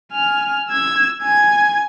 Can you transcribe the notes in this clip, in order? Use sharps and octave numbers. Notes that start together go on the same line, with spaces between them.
G#5 F6
E6 G#6
G#5 G#6